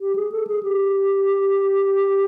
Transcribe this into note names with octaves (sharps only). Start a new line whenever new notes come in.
G4
G#4
A4
G#4
G4